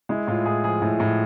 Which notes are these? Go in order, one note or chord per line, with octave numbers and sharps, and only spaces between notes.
G#3 E4
A2 F4
A2 G#4
F3 G#4
A2
A2